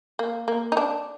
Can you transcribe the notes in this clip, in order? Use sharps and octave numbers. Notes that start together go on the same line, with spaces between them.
A#3
A#3
D#4
D4